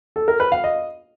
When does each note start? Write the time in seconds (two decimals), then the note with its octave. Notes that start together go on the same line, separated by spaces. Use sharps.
0.16 A4
0.28 A#4
0.40 B4
0.52 F5
0.64 D#5